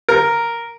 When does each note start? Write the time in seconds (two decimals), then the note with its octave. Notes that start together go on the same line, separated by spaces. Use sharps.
0.09 A#4